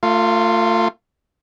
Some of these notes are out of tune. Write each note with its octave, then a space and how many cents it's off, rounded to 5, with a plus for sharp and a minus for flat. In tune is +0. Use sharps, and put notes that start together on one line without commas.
A3 +40 F4 +0